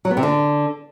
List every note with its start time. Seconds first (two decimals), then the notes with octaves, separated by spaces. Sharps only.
0.05 F#3
0.11 B3
0.17 C3
0.23 D3